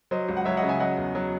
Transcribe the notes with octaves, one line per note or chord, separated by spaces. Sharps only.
F#3 C5 D#5
C#2
F#5
F#3 C#5 E5
D#5 F#5
C#3
E5 G#5
F#3 D#5 F#5
E2
F#3